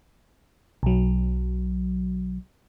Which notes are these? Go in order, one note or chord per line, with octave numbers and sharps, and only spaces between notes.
B1 F#3